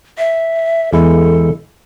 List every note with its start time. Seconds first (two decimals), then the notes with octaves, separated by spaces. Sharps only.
0.18 E5
0.93 E2 G#3 E4 A4